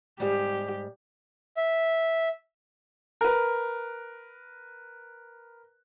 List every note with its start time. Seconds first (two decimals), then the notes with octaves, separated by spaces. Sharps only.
0.20 G#2 G3 G4
1.57 E5
3.21 A#4 B4